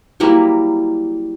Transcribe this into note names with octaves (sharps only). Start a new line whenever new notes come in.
F#3 G3 A#3 E4